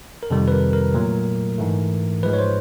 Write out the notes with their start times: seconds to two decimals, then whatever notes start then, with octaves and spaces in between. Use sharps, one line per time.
0.23 A#4
0.30 F2 C3 D#3 G3 A4
0.48 B4
0.52 A#4
0.73 A#4
0.94 A#2 F#3 A3
1.58 G#2 E3 A3
2.23 G#2 F3 G#3 B4
2.33 C#5
2.39 C5